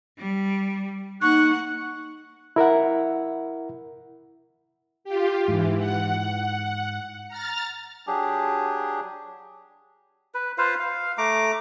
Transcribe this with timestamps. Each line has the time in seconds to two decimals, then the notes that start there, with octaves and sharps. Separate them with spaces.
0.19 G3
1.22 A#3 D#4 F#5 C#6 F#6
2.56 E4 A#4 E5 F#5
5.04 F4 G4
5.48 G#2 E3
5.78 F#5
7.28 A#5 F6 A6
8.07 F#3 D4 G4 G#4
10.34 B4
10.58 F4 B4 C5 F5
10.79 F5
11.18 A3 A#5 D6